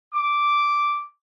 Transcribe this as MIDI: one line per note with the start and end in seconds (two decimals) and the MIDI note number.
0.14 1.04 86